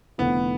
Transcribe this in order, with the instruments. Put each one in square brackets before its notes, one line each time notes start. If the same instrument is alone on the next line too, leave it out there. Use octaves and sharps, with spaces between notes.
[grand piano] F1 F2 D3 A3 E4 [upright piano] B3